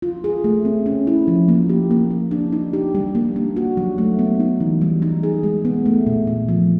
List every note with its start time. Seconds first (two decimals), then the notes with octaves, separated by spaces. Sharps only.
0.02 F4
0.24 G#4
0.44 A3
0.65 C4
0.86 C#4
1.07 E4
1.28 F3
1.48 A#3
1.69 G4
1.91 A#3
2.11 A#3
2.31 D4
2.52 D#4
2.73 G4
2.95 G3
3.15 A#3
3.36 D4
3.57 F#4
3.77 F#3
3.98 A3
4.19 B3
4.40 D#4
4.60 E3
4.81 G3
5.02 D#4
5.23 G#4
5.43 G#3
5.65 B3
5.86 A3
6.06 A#2
6.27 A#2
6.48 F3